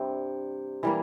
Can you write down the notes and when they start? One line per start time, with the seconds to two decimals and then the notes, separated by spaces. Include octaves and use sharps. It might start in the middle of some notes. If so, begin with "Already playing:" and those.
Already playing: G2 C3 G3 C4
0.83 E3 G3 A#3